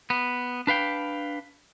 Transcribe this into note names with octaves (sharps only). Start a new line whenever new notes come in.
B3
D4 B4 F5 G5